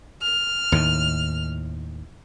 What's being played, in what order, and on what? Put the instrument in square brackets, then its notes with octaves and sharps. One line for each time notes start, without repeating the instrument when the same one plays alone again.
[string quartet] F6
[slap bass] D#2 A2 D#3